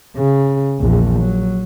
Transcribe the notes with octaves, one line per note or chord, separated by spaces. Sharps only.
C#3
A#1 E2
F#3